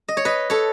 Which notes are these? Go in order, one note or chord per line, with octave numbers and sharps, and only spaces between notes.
D#5
C#5
B4 D#5
A4 C#5